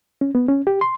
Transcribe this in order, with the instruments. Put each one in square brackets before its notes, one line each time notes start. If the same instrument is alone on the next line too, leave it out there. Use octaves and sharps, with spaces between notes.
[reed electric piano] C#4
B3
C#4
G4
C6